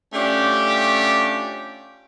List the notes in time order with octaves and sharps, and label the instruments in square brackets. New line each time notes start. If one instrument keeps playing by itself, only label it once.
[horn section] A3 C#4 D4 F4 G4